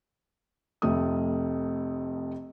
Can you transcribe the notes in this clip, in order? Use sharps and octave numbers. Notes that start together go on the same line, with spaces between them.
F1 F2 A3 D#6